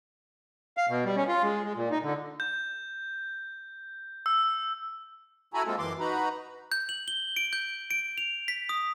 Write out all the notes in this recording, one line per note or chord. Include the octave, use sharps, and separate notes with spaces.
F5
B2
G3
C#4
F4
G#3
G#3
A#2
D#4
D3
G6
E6
E4 F#4 A4 G#5 A#5 B5
G#3 A#3 C4 F4 A4
F#2 E3 C6 D6
D#4 F#4 B4 A#5 B5
G6
F#7
G7
D7
G6
D7
F7
B6
D#6